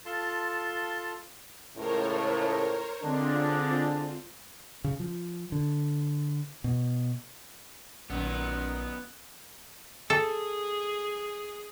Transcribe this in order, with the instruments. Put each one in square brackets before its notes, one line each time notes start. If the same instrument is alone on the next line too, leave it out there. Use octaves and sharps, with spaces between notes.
[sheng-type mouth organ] F4 A4 A5 C6
[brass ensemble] C#2 A2 [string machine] A#4 C5 C#5
[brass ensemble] D3 G#3 D4 [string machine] C4 F4
[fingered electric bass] C#3
F3
D3
B2
[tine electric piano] A#1 [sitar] F#2 A#2 D#3 [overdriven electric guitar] B3
[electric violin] G#4 [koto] A4